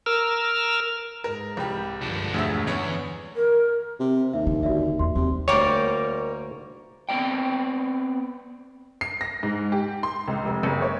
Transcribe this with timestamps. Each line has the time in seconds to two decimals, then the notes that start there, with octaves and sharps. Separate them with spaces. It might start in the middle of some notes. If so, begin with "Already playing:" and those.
0.06 A#4 E6 F6
1.24 G#2 A#4
1.57 C2 G3 G4
2.02 G2 D3 F3 D4
2.34 E1 D2 E5
2.67 E2 B3 C#4 C#5
3.36 A#4
4.00 C3
4.33 D#2 E5
4.47 D3
4.63 F#4 D5 E5
4.99 E2 C6
5.15 D#2 C3
5.48 D2 G3 A#3 A#4 C#5
7.09 B3 C4 D5 G5
9.01 C7
9.21 A#6
9.43 G#2
9.72 G4
10.03 C6
10.28 C#2
10.45 F1
10.63 F#1
10.82 C#5